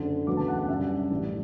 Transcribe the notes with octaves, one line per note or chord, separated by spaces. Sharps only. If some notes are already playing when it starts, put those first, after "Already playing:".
Already playing: F#1 F#2 D3
E1 D2 C#3 F#3 B3 D6
A5
F#5
F#5
F#2 C#3 G3 D4 E5
A1 A2 G3